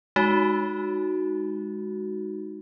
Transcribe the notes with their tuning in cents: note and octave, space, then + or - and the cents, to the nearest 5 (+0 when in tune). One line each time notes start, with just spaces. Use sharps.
G#3 +0 D#4 +0 F#4 +0